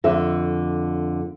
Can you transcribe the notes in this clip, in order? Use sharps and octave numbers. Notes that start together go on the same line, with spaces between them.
F2 D3 E5